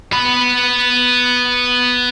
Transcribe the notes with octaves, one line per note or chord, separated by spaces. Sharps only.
B3 B5